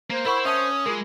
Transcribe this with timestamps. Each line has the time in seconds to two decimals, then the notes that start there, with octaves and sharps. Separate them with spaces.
0.10 A#3 C5
0.26 E4 A#4 E5 F#5 B5 C#6
0.45 C#4 E5 A5 D#6
0.86 G#3 F4 G#4 A#4